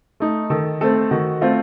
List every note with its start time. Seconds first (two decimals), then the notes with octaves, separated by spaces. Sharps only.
0.20 A3 D#4
0.50 D#3 A4
0.81 A3 C4 A4
1.11 D#3 F#4
1.41 A3 C4 F4